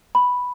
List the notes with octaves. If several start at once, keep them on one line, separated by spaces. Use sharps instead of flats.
B5